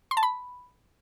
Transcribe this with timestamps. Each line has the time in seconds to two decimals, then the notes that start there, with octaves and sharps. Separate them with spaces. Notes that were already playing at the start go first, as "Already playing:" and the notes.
0.11 C6
0.17 A5
0.23 B5